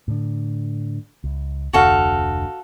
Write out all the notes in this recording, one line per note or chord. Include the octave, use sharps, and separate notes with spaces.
A2 D3
C#2
F1 D2 D3 F#4 A4 F5